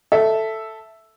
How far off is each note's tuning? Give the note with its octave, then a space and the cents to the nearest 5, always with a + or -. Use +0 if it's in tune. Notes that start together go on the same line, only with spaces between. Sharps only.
A4 +0 E5 +0